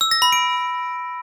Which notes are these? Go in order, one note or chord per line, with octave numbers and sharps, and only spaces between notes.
E6
A#6
B5
D7